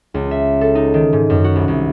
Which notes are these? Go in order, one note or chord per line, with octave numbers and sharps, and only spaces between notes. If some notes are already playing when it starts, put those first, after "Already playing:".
C#2
E5
A4
D#4
D#3
G#2
F#2
F#4
C2
C2